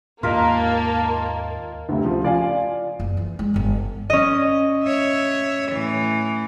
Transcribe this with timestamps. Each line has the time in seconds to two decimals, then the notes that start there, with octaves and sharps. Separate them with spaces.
0.23 D#2 G#2 A#3 F4 A#4 D#5 A5
1.89 D2 C3
2.04 C#3 F3
2.23 F4 D5 F5 G#5
3.00 F#1
3.17 E3
3.39 G#3
3.54 G1 D3
4.10 C#4 D#5
4.84 C#5 E5
5.72 A2 E3